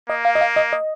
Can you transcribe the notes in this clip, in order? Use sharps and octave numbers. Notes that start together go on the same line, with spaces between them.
A#3 D#5
F5
D#5
F5
D#5
D#5